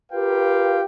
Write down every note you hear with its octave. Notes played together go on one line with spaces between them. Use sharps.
F4 G4 A#4 B4 F5 G5